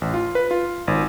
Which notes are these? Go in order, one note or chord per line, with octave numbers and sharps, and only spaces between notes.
A1
F4
B4
F4
G#1